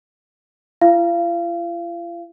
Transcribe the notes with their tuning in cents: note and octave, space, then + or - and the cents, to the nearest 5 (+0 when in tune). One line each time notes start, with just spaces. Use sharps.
F4 -45 F5 -30